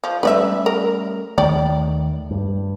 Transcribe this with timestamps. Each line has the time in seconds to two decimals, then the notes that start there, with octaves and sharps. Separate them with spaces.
0.04 F3
0.23 G3 A3 C#4 B4 D5 E5
0.66 A#4
1.38 D#2 D#3 A3 D5 G5
2.31 G2